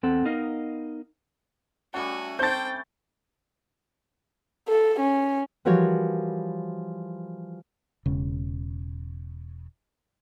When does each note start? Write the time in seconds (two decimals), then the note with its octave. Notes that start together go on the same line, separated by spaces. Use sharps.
0.03 E2 C4 A4 F#5
0.25 B3 D#4 A#4 D#5 F5
1.94 G3 A3 C#4 F#4 F#5 G#5
2.39 C4 C5 G5 A5 G6 A6
4.68 A4
5.00 C#4
5.65 E3 F3 G3 F#4 A#4 C#5
8.06 E1 C#3